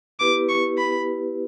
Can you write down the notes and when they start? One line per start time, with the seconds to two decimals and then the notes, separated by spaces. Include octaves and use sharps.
0.20 B3 E4 G4 B4 D6
0.49 C#6
0.78 B5